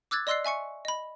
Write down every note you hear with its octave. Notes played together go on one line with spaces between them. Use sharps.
D6 E6 F#6 G#6 A6
D5 D#5 C6 E6 F#6 C7
E5 G#5 C#6 C#7
D#5 B5